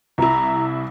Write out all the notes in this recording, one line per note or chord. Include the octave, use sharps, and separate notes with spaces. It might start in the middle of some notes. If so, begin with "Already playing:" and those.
C2 E4 A#5